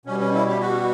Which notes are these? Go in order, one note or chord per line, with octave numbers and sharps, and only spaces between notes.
B2 G3 C#4
C#4
E4
G4
F#4